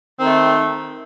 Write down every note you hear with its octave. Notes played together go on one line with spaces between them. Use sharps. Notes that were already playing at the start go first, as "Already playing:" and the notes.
D#3 A3 C4